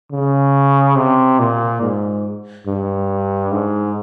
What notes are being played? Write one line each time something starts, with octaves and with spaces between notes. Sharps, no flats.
C#3
C3
A#2
G#2
G2
G#2